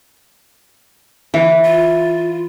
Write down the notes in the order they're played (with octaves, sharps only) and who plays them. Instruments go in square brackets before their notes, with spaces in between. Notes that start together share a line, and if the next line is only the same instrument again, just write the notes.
[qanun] E3
[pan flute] F4